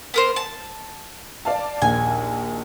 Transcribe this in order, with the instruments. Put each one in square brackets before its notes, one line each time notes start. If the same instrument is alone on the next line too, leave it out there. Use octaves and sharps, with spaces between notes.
[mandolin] B3 A#4 C5
A5
[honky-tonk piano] D5 F5 A5
[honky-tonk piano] A#1 D#2 [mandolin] G#5